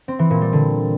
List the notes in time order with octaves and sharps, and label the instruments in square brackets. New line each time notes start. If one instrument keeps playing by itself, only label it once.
[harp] C4
E3
A#2
G3
D3